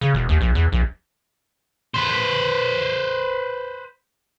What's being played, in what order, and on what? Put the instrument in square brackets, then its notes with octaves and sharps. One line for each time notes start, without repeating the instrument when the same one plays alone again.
[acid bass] C#3
E1
D#2
A#1
E2
A#1
[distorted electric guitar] B4 C5